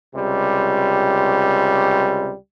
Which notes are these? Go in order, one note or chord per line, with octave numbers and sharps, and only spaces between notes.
C#2 C3 G3